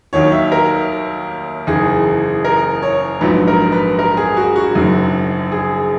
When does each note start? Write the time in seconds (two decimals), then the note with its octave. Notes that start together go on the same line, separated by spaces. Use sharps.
0.13 D#2 D#3 F#3 C#5
0.32 E5
0.52 A#4
1.67 F#1 E2 D#3 G#4
2.44 A#4
2.82 C#5
3.21 A#1 G#2 F#3 B4
3.47 A#4
3.72 B4
3.99 A#4
4.17 G#4
4.37 F#4
4.56 F#4
4.75 F#1 F#2 D#3 F#3
5.52 G#4